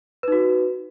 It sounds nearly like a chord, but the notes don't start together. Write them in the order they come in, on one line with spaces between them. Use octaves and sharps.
B4 D#4 F#4